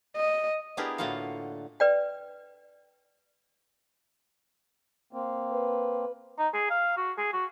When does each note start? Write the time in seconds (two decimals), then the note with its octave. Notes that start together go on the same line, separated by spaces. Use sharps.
0.17 D#5
0.77 B3 D4 E4 G4 G#4 A#4
0.98 A2 D3 A#3 F4 F#4 F5
1.80 B4 D5 G5
5.13 A#3 C4
5.52 B4
6.39 D#4
6.54 G#4
6.70 F5
6.97 F#4
7.18 G#4
7.33 F#4